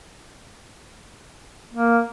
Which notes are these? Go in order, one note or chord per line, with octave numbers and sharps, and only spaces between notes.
A#3